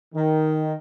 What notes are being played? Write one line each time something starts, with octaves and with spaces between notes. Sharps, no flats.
D#3